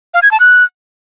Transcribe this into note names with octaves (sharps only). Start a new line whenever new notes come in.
F5
G#6
A5
F#6